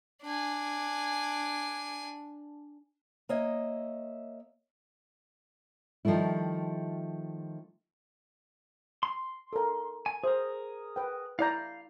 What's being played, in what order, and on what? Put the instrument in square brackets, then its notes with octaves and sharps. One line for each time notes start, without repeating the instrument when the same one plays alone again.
[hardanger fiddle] D4 G#5
[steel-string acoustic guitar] A#3 C#5 D#5 E5
[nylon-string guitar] D#3 F3 G3 A3 E4
[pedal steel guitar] C6
[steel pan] A4 A#4
[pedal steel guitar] G#5
[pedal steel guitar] G#4 A#4 [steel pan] C5 E5
[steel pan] B4 G5
[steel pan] E4 D5 A#5 [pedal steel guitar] F5 G6